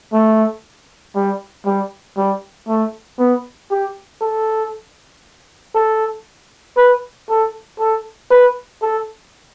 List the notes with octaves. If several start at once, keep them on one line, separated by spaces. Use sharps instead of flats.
A3
G3
G3
G3
A3
B3
G4
A4
A4
B4
A4
A4
B4
A4